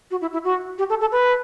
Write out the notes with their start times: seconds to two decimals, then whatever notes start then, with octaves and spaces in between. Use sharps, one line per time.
0.11 F#4
0.21 E4
0.33 E4
0.44 F#4
0.78 G4
0.89 A4
1.01 A4
1.12 B4